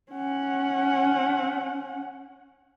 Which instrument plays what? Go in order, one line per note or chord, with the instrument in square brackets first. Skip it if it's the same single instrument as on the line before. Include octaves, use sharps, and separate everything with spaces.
[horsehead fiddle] C#4 F#5